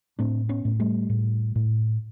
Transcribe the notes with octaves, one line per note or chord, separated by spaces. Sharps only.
A2 C4 D4
B3 C#4
A2
G3 A3
A2
A2